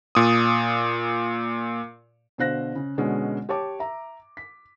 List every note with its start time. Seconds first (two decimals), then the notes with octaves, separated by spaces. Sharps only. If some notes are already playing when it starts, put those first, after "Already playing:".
0.15 A#2 D#6
2.38 B2 D3 C5 F5 F#6 A#6
2.75 C#3
2.98 B2 D3 G#3 B3 C#4
3.49 G4 C#5 A5 D6
3.80 E5 A#5
4.37 B6